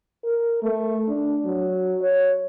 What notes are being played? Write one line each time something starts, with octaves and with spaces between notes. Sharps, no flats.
A#4
A3
D4
F#3
C#5